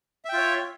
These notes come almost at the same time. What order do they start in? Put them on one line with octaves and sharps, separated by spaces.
E5 G5 F4 C#5